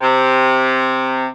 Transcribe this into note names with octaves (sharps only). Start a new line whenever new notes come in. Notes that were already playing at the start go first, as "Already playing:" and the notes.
C3